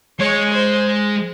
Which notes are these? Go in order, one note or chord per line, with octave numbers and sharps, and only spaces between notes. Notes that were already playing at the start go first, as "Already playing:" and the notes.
G#3 C#5
C5